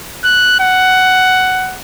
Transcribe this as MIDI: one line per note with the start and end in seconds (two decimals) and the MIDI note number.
0.24 0.56 90
0.60 1.79 78